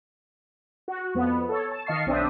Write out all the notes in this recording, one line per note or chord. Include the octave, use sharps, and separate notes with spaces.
F#4
F2 B3
A4 C#5
A5
D#3 D#5 F5 A5 C#6 C7
B1 C4 D4 E5 D#6